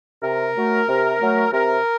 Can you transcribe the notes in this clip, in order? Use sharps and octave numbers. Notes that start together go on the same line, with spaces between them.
C3 A#4
F#3 A3
C3
F#3 A3
C3 A#4